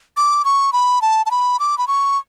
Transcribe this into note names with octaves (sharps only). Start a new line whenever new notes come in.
D6
C#6
B5
A5
A5
B5
D6
B5
C#6